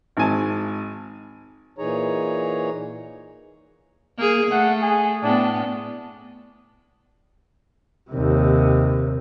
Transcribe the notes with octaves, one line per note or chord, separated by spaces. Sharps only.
G#1 G#2 G#5 A5
A#2 E3 D#4 G#4 C#5 A#5
A#3 G#4
A3 F#5
G#4
A2 B3 D4
D#2 C3